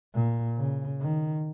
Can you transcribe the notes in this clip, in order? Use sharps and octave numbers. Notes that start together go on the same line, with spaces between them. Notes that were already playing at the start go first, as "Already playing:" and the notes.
A#2
C#3
D#3